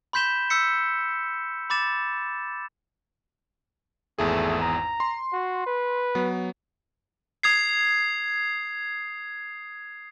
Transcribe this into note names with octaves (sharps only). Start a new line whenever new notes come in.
B5 C6 G6 B6 E7 G7
E6 G6 B6 C#7
B5 D6 A6 E7
G#1 E2 A3 G#4
A#5
C6
F#4
B4
F#3 B3
D#6 G#6 C7